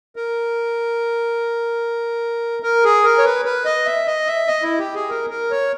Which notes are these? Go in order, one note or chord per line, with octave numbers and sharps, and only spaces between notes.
A#4
A#4
G#4
A#4
C#5
B4
B4
D#5
E5
D#5
E5
D#5
E4
G4
G#4
A#4
A#4
C#5